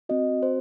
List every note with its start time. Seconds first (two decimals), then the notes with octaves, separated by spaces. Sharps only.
0.09 C4 F#4 D#5
0.43 C5